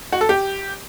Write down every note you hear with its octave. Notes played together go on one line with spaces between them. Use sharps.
F#4
A4
G4